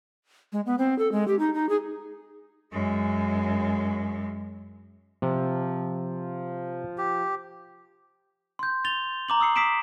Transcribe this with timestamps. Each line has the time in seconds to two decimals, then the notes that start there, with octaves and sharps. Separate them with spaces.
0.53 G#3
0.66 B3
0.79 C4
0.99 A4
1.12 G#3
1.28 G4
1.39 D#4
1.54 D#4
1.69 G#4
2.72 F#2 G#3
5.22 C3 F3
6.98 G4
8.59 C6 G6
8.85 A6 F7 G7
9.29 A#5 D6 F#7
9.40 D#6 E6 C7 C#7
9.56 D#6 E6 B6 C7 D7 E7